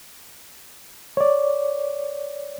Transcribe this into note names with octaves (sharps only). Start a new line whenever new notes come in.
C#5 D5